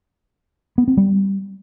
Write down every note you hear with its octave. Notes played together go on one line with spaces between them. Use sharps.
B3
C4
G3